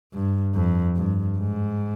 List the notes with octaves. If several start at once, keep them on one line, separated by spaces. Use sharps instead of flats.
G2
F2
G2
G#2